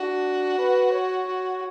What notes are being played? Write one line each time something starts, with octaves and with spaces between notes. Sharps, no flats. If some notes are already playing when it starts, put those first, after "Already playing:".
Already playing: D4 F#4
B4
C#5
F#4